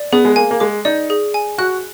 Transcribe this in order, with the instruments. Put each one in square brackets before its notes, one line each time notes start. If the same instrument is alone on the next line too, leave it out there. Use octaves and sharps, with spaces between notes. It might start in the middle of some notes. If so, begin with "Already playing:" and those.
Already playing: [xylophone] D5
[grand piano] B3 [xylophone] G#4
[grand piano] G#3
[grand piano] A#3 [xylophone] G#5
[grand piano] A#3
[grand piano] G#3 [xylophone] D6
[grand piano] D#4 [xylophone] D5
[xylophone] G#4
G#5
[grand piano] F#4 [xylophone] F#6